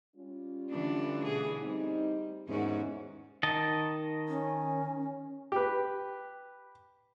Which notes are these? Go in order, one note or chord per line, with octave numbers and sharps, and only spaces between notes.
G3 C#4 F4
D3 E3 A3 D4
B2 G#4
G3 C4 D#4
E2 G#2 C3 D#3 C#4 F#4
D#3 D#5 A5
C#4
G4 B4